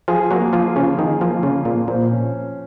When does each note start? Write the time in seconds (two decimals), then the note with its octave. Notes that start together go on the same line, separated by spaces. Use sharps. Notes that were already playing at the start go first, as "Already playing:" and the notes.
0.08 F3 G#4
0.31 F#3 A#3
0.53 F3 F4
0.76 C#3 F3
0.98 D#3 G#4
1.21 F3 A#3
1.43 C#3 F4
1.65 A#2 F3
1.88 A#2 C5
2.11 C#4